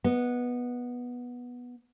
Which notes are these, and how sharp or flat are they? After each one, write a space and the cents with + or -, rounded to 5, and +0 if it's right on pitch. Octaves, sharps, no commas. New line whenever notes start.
B3 -10 D#5 +0